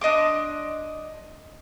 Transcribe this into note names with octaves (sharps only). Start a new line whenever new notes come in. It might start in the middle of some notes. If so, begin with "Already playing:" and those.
D4 D#5 C6 D6